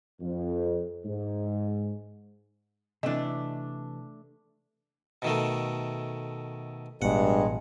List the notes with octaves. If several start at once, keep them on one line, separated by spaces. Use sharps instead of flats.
F2
G#2
C3 E3 A3 D4 D#5
B2 D#3 A3
A1 G2 B2 G#3 F#5